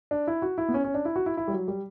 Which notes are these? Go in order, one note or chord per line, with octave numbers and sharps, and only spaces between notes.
D4
E4
F#4
E4
B3
C#4
C#4
D4
E4
F#4
E4
E4
G3
F#3
G3